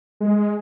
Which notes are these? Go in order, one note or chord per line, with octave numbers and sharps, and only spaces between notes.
G#3